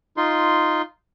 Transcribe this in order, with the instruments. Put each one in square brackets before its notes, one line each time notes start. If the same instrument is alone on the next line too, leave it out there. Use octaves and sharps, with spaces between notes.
[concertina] D#4 F4 C6